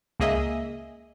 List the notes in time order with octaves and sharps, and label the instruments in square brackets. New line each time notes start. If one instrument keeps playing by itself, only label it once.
[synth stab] C#2 A#3 G#4 D#5 E5